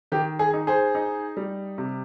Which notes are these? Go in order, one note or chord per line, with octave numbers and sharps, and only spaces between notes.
D#3 G4
G#4
D#4
G#4 C5
D#4
G3
C3